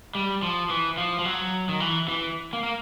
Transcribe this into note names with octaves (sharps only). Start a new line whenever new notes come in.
G3
F3
E3
F3
F3
F#3
D#3
E3
E3
A#3
A#3